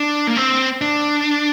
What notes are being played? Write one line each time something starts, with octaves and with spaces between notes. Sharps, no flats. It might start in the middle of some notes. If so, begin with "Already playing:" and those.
Already playing: D4
A#3
C4
D4